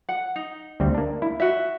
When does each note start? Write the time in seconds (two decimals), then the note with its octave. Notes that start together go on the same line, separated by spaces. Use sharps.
0.09 F#5
0.36 D#4
0.80 D2 G3 C4
0.94 A#3 D4
1.22 E4
1.40 F#4 E5